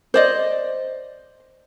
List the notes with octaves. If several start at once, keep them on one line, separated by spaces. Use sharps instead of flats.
C5 D5 D#5